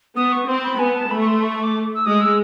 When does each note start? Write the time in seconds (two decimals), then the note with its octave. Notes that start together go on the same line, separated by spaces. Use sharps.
0.16 B3 D#6
0.32 C#6
0.47 C4 C6
0.63 B5
0.79 B3 G#5
0.95 A5
1.11 A3 B5
1.21 C#6
1.27 C6
1.42 C#6
1.63 D6
1.94 E6
2.05 G#3 D#6
2.21 E6